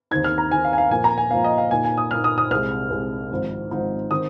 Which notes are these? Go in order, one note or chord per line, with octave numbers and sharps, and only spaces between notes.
D#2 D#3 C4 D#4 G#6
F6
A#5
D#2 D#3 C4 D#4 G#5
F5
G#5
F5
A#2 F3 A#3 G#5
A#5
G#5
A#2 F3 A#3 F5
D#5
F5
A#2 A#3 D#4 G#5
G#5
D#6
A#2 A#3 D#4 F6
D#6
D#6
C2 C3 G#3 F6
C2 C3 G#3
G#1 G#2 F3 C4 D#4
G#1 G#2 F3 C4 D#4
D#3 C4 D#4 D#6